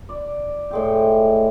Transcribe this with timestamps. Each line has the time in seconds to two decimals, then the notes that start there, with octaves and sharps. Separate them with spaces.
0.09 D5
0.71 A2 G#3 G5